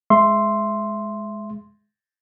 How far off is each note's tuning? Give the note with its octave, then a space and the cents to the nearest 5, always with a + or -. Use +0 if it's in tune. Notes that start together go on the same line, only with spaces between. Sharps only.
G#3 +10 E5 +15 C6 +0